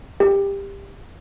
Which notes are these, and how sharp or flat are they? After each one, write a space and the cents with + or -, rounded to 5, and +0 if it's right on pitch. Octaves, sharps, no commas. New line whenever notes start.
G4 +20